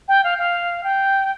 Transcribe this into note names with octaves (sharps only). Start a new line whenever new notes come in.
G5
F5
F5
G5